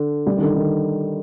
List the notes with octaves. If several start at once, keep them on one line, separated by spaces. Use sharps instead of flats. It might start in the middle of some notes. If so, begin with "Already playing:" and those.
Already playing: D3
G3
D#3
D3
D#3